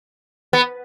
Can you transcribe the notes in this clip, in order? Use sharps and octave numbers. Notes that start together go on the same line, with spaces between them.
B3